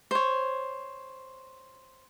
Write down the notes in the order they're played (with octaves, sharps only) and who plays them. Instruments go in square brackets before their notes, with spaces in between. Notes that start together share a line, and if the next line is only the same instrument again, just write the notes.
[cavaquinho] C5 C#5